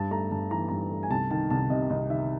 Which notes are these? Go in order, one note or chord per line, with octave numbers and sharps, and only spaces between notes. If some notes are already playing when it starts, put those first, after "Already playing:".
Already playing: G2 A5
A3 A#5
G2 A5
E3 A#5
G2 A#5
A3
G#5
C2 A5
D#3 A5
C2 A5
C3 D#5
C2 D#5
D#3 E5